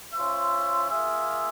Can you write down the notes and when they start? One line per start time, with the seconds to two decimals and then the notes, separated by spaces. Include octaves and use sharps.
0.14 C#4 F4 C5 E5
0.90 A#3 F4 G#4 E5